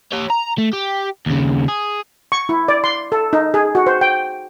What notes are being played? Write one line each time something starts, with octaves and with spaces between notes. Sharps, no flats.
G4 C#5
A#5
A3
G4
D#2 C#3
G#4
C#6
E4
D5
C6
A4
D#4
G#4
F#4
C5
G5